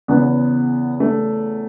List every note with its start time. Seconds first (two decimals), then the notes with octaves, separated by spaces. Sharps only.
0.08 E2 C#3 E3 B3
1.00 A3